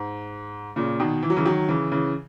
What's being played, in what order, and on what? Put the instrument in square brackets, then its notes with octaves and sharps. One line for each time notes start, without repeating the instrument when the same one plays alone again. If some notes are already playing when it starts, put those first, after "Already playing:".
Already playing: [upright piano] G#2
A#2 C#3
B2 D#3
E3
F#3
C#3 E3
D#3 F#3
C#3 E3
C#3 E3